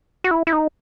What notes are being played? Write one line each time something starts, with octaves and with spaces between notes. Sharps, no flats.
F#4
E4
E4
D#4